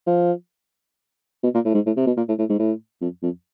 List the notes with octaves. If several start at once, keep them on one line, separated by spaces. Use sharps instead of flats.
F3
B2
A#2
A2
G#2
A2
C3
B2
A#2
A2
A2
G#2
A2
F2
F2